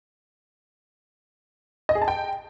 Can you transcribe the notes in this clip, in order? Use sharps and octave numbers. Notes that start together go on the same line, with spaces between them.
D#5
G#4
A5
G5